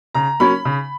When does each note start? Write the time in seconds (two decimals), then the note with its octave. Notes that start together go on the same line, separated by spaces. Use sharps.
0.15 C#3 A#5
0.40 F#3 A#3 C#4 B5
0.65 C#3